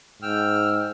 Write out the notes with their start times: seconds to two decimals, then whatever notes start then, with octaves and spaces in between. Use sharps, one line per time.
0.22 G#2 G5 E6 F6